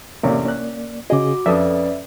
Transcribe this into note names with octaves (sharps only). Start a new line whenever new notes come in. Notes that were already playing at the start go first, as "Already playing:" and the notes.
A1 C3 A#3 C#4 D5
C#4 F#6
C#3 F#4 G#4 D#5 D6
F2 C#4 A4 B4 D5 E5 D#6